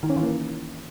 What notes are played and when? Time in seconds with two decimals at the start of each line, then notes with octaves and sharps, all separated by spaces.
0.03 D#3
0.10 C#4
0.16 E3
0.23 A#3